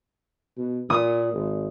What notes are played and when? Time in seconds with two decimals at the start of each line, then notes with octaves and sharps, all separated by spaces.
0.57 B2
0.90 A#2 D#6
1.33 G#1